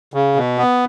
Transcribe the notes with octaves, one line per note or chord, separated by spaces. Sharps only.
C#3
B2
B3